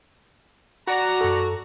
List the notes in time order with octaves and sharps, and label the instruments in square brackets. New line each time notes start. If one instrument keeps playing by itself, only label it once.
[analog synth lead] F#4 [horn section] D5 A#5
[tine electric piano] F#2 A4